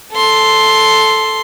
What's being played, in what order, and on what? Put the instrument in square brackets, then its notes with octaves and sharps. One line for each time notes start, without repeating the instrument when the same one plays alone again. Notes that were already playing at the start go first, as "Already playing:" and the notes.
[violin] A4 C6